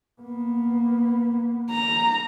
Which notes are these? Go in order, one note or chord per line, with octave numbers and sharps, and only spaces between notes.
A#3 B3
A#5